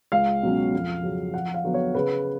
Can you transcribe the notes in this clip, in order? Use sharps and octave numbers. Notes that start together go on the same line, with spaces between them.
C#2 F5
B2 F#3 C#4
F2
C#3 F#3
F2 F#5
F5
D3 F#3 B3
C#5
C#3 B4